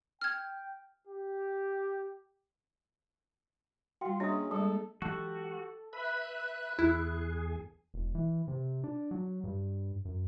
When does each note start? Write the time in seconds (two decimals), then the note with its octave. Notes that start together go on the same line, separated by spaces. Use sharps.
0.21 G5 F6 G#6
1.07 G4
4.01 G3 F4 F#4 F#5 G5 C6
4.20 A#3 C#4 D4 G#4 D#5 E5 D#6
4.51 G3 G#3 A4
5.02 E3 F#3 G#3 F#4 G4 A4
5.93 B4 E5 B5 F#6
6.79 E2 E4 G#4
7.94 E1
8.15 E3
8.48 C3
8.84 D4
9.11 F#3
9.44 G2
10.05 F#2